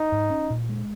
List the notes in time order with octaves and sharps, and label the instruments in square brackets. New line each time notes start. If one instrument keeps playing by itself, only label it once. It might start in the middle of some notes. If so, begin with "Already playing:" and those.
Already playing: [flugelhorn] D#4
[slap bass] G#2
C#4
A#2
G#3